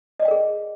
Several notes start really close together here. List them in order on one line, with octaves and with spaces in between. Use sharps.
D#5 D5 G5 A#4 G#4